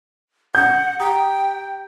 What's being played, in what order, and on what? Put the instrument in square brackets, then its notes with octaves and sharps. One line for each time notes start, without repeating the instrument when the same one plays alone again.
[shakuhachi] F#5 [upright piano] G6
[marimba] G4 A#5 D#6 [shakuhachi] G5